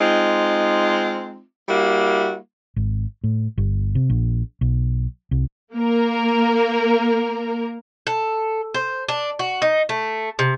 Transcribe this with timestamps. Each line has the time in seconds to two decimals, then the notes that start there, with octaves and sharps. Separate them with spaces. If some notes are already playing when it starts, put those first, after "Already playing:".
0.01 G#3 C4 D#4 F4
1.69 G3 A#3 E4 F#4
2.76 G#1
3.24 A2
3.58 G1
3.95 C3
4.10 A#1
4.61 B1
5.31 C2
5.74 A#3 A#4
8.07 A4
8.74 C5
9.09 D4
9.39 F#4
9.62 D#4
9.89 A3
10.39 C3